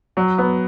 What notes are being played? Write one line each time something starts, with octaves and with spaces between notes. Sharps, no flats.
F#3
B3